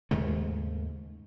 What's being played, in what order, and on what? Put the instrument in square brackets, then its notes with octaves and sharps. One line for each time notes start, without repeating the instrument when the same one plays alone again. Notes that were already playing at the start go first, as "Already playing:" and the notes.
[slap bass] D#2 G#2 C#3 A3